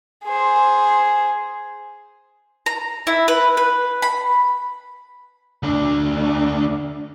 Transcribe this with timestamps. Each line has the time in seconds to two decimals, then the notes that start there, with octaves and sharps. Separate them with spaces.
0.24 G#4 C5
2.66 A#5
3.07 E4
3.28 B4
3.57 B4
4.02 B5
5.63 D2 D4